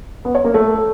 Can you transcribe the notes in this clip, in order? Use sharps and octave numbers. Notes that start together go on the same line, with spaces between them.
B3
C#5
A#3
A3